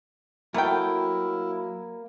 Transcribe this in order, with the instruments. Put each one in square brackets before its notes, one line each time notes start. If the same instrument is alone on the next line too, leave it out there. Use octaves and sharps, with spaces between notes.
[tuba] F#3 [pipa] A3 F#4 G5 [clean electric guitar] A#3 A#4 [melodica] E4